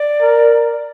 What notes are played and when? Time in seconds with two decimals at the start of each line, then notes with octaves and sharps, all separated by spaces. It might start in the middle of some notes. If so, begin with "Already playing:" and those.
Already playing: D5
0.22 A#4